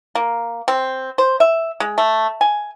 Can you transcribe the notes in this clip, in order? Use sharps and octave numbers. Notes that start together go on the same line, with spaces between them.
A#3
C4
C5
E5
G#3
A3
G#5